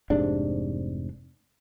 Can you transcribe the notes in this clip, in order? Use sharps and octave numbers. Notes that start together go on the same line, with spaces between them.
F1 G#2 C3 D4